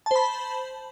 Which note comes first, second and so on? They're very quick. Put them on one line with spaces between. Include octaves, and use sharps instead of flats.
A5 C5 B5